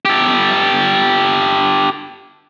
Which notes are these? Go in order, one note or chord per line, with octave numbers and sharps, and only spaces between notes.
G4 A4